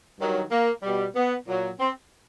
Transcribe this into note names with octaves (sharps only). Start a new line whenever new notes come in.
G2 D#3 F#3
A#3
B2 G3
B3
A#2 F#3
C4